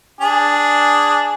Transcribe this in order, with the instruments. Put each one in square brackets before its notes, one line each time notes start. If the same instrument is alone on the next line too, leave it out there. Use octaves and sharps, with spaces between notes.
[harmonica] D4 G#4